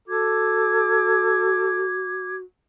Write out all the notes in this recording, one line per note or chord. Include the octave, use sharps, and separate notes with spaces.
F#4 A4 D6 G#6